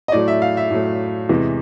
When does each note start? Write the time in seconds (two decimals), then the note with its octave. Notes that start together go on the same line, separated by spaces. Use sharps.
0.08 D#5
0.12 A2 F#3 A3 D5
0.28 E5
0.42 F5
0.57 E5
0.71 A2 F#3 A3
1.29 E2 C3 E3 G#3